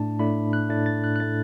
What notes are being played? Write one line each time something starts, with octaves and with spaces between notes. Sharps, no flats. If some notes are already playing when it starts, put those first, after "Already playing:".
Already playing: A2 A3 D4 A5
A2 A3 D4 B5
F#6
A2 A3 D4 A6
A6
F#6
F#6
A2 A3 D4 A6